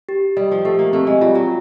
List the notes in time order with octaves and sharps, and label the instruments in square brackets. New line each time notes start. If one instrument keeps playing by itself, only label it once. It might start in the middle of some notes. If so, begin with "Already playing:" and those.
[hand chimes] G4
[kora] G3 [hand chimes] D#5
[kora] F3
[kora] A3 [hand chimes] G4
[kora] A#3
[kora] A3 [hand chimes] C4
[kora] G#3
[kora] G3 [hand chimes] F4
[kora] F#3